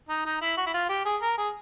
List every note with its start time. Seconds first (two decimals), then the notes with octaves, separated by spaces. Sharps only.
0.09 D#4
0.25 D#4
0.41 E4
0.57 F#4
0.66 E4
0.74 F4
0.89 G4
1.05 G#4
1.22 A#4
1.38 G#4